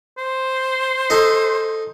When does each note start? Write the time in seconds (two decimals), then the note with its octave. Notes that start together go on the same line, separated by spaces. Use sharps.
0.18 C5
1.10 D#4 A4 G#5